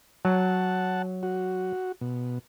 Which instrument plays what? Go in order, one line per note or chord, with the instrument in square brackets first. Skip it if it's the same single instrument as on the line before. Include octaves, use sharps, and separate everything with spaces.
[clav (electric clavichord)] F#3 [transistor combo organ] F#5 A5
[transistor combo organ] F#4
B2